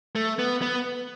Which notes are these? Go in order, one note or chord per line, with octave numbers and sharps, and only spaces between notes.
A3
B3
B3